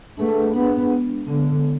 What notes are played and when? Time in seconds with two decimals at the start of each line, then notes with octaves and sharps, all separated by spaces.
0.17 A3 D4 G#4 B4 F#5
0.54 B3 D4 G#4 B4 F#5
0.90 G#3 B3 D4
1.26 D3 G#3 B3 D4
1.63 G#3 B3 E4 A4 C#5